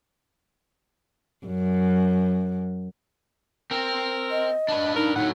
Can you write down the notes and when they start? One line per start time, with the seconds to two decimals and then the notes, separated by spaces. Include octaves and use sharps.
1.46 F#2
3.71 C4 A#4
4.31 D#5
4.68 D4 B4
4.96 D#4 A#4
5.16 A2 F#3 D#4 F#5